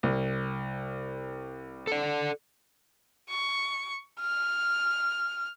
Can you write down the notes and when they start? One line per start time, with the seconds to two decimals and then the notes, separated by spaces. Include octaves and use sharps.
0.03 C2
1.87 A4 D5
3.30 C#6
4.20 F6